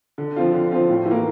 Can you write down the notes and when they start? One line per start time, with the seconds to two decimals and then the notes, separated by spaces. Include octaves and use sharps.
0.18 D3
0.36 F3 C4 F4
0.54 D3
0.71 F3 C4 F4
0.89 A2
1.06 E3
1.11 A#3